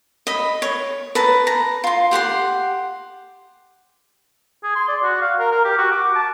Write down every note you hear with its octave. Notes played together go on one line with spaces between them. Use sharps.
D#5 B5
C#5
B4 A5 A#5
A#5
F4 C6
G4 F#5 B5 C6
G#4
C6
D5
F#4
F5
A#4
A#4
G4
F#4
D6
A5